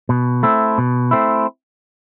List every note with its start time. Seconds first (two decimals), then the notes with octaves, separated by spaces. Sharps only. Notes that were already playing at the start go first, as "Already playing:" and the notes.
0.09 B2
0.43 A3 C4 E4
0.78 B2
1.11 A3 C4 E4